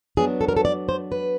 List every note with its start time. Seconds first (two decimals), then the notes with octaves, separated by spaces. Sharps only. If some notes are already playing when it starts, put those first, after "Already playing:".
0.17 F#3 B3 D4 G#4
0.41 A4
0.48 A#4
0.57 A4
0.65 D5
0.89 C5
1.12 B4